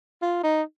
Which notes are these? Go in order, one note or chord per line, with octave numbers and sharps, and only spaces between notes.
F4
D#4